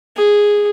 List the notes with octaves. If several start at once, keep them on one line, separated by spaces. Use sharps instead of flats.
G#4